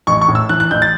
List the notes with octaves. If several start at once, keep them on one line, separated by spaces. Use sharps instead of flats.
A1 C#6
C#6
A2
E6
E3 F#6
F#6
A1 G6
A6